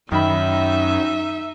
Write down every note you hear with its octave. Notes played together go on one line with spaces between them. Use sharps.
F#2 D#3 D#4 E5 B5